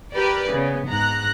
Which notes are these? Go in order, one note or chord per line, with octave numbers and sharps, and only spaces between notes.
G4 A#4 B4 D5
C#3 B3
G#2 A#5 F#6